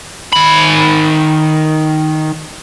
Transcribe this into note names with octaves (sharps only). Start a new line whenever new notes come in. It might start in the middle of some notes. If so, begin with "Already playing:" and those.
D#3 B5